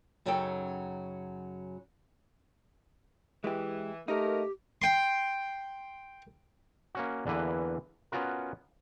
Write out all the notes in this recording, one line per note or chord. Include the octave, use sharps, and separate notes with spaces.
F#2 C#3 F#3 D#4 A4 G5
E3 G#3 G4
A3 A#3 D#4 G4 A#4
G5 C6
A#3 C#4 F#4
E2 D3 E3 A#3 B4
B3 C#4 F4 F#4 A#4